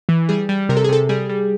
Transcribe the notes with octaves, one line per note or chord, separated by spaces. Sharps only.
E3
G3 G#4
G3
C3 A#4
A4
G#4
C3 A4
G3 G#4
G3